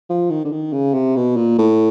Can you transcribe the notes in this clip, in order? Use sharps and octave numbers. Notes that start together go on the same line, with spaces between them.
F3
D#3
D3
D#3
C#3
C3
B2
A#2
A2